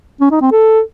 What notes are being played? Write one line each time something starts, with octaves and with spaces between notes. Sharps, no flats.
C#4
D#4
C4
A4